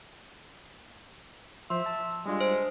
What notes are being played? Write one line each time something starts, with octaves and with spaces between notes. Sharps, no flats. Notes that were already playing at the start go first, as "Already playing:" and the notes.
F3 C5 E5 C6
A5
G3 G#3 D4 F4
C5